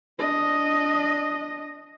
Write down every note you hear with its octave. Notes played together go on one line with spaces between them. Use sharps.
D4 D#5